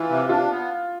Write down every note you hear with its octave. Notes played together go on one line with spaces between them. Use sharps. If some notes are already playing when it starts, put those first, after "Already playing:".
Already playing: E3 E4 F4
C3
D4 F4
B3